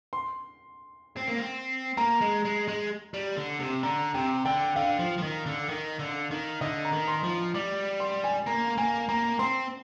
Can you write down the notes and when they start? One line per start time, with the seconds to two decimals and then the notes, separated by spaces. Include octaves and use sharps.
0.13 C6
1.17 C4
1.28 A#3
1.38 C4
1.97 A#3 A#5
2.21 G#3
2.45 G#3
2.68 G#3
3.14 G3
3.37 D3
3.60 C3
3.83 D3 A#5
4.14 C3 G5
4.45 D3 G5
4.76 D3 F5
4.99 F3
5.18 F3
5.22 D#3
5.46 D3
5.69 D#3
5.99 D3
6.31 D#3
6.61 D3 D#5
6.85 A#5
6.92 D#3
7.08 C6
7.23 F3
7.54 G3 D6
8.00 C6
8.24 G#5
8.46 A#3 A#5
8.78 A#3 G#5
9.09 A#3 A#5
9.39 C4 C6